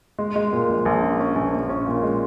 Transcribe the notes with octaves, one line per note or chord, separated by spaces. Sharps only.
G#3
G#3
A#2
A#1
A#1
C#4
C#4
A#1
A#1
C#4
A#2
G#3